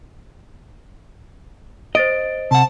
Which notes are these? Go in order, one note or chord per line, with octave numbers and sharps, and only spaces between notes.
C5 D#5 A6 D7
C3 F#5 A5